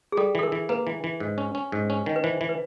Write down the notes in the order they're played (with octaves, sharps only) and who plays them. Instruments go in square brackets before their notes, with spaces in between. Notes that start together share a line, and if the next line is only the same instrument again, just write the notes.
[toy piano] G#4
[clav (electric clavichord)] G3 [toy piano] A4
[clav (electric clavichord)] E3 [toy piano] A4
[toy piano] A#4
[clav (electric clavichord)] E3
[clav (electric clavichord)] A#3 [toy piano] B4
[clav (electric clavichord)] E3
E3
G#2
C#4
C#4
G#2
C#4
D#3
[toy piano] B4
[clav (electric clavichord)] E3 [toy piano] C5
[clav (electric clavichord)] E3
[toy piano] B4